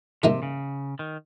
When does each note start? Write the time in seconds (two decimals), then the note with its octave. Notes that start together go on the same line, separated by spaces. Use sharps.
0.23 G#2 C3 E3 G3 A#3 D#4
0.43 C#3
0.99 D#3